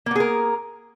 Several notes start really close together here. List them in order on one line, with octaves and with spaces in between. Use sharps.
A#3 B3 G#4 A#4